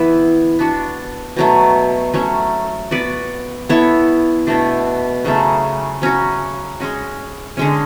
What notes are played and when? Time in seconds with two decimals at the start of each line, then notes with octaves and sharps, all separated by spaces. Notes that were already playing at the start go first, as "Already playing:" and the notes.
Already playing: E3 B3 E4 B4
0.59 B3 D4 F#4
1.37 B2 F#3 A3
2.14 F#3 A3 C#4
2.91 B3 F#4 B4 D5
3.69 B3 E4 A4 C#5
4.47 B2 A3 D4
5.24 C#3 F#3 A3
6.02 F#3 C#4 F#4
6.80 G#3 C#4 F#4
7.57 D3 G#3 C#4